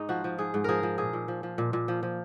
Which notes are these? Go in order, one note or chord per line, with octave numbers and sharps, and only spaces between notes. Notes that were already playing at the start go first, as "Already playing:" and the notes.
Already playing: G#2 D#4
F3 F#4
F3
G#2 G#4
G#2
F3 G#4 A#4
F3
A#2 G#4
A#2
F3
F3
A#2
A#2
F3
F3